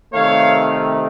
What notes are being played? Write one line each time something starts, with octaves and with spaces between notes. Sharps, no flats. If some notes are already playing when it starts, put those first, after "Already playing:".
C3 D#3 A3 C#5 F5